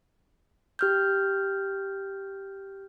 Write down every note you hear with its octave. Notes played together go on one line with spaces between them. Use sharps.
G4 F6 G6